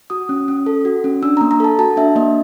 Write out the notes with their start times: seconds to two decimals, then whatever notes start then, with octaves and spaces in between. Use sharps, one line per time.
0.10 F#4 D#6
0.29 C#4
0.48 C#4
0.66 A4
0.85 F#4
1.04 C#4
1.22 D4 E6
1.37 A#3 A#5
1.51 A#5
1.60 A4 A5
1.79 F#4 A5
1.97 D4 E5
2.16 A#3 D#5